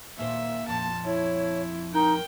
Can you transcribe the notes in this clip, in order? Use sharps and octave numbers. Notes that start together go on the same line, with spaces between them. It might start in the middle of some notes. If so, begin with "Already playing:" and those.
D#2 A#2 A#3 C5 E5
F2 A#2 F3 A5
E4 C#5
D#4 A#4 G5